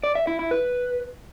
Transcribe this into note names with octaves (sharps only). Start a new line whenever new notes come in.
D5
E5
E4
E4
B4